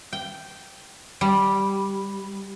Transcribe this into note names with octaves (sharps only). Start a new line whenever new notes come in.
G5
G3